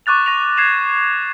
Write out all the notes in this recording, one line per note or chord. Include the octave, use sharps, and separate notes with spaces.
C#6 D6 F#6 A6 F7
C#6 A#6 D#7 F7
G#6 C7 E7 F7